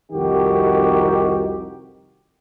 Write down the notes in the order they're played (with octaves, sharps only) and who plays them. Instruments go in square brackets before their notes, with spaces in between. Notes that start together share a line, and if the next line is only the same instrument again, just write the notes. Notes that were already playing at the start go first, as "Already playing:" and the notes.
[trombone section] C2 F2 D#3 D#4 F#4 G4